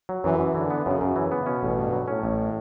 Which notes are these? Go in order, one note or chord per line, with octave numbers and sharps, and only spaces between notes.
F#3
F#2 E3
F#2
D3 E3
B3
F#2 C#3
F#2
E3
B3
B2 C#4
A1
G2
F#3
A2 C#4
A1